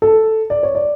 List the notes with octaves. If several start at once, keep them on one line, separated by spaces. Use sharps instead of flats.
A4
D5
C#5
D5